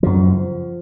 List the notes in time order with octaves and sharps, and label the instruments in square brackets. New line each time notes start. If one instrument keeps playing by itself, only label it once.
[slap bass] F#2 C#3 F3